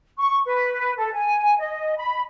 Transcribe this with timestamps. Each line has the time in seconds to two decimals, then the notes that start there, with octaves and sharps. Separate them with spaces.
0.18 C#6
0.46 B4
0.96 A4
1.13 G#5
1.58 D#5
1.97 B5